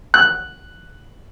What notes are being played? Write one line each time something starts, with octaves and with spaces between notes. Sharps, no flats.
F#6